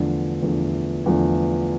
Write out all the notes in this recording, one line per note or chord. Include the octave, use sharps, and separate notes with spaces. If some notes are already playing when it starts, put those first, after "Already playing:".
Already playing: E2 D3 F3 A3
E2 D3 F3 A3
E2 D3 F3 A3